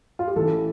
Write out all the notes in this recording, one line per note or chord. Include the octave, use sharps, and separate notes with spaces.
F4
G4
A1 A2 E3 A4